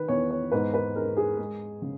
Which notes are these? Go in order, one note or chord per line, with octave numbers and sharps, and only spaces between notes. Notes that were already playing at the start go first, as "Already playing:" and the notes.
Already playing: D#3 B4
E2 C#5
C#5
G#2 B4
B4
G#3 A#4
G#4
G#3
C#3